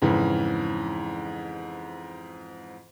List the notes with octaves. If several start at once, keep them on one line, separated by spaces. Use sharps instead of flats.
F2 G#2 C#3 E3